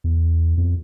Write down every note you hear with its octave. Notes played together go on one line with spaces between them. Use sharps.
E2
F2